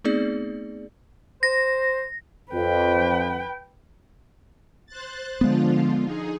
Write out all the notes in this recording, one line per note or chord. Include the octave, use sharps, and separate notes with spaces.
A3 B3 C4 D#4 G#4 D5
C5 A#6
F2 B4 G5
C5 F#6 A6
D3 F3 G#3 B3 F4
D#4 G#4